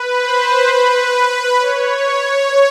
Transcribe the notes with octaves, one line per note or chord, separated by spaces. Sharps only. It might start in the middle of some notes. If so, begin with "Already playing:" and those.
Already playing: B4
C5
B4
C#5